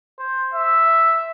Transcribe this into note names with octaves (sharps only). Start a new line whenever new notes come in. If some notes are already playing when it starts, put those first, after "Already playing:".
C5
E5